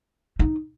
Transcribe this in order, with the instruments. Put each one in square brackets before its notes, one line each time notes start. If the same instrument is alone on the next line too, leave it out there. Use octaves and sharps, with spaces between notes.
[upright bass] D#4